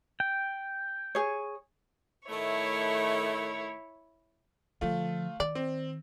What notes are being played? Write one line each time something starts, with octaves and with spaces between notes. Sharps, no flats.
G5
G#4 C#5
A2 D#3 A3 E4 C#5
D3 F3 A3 F4
D#3 D5
C4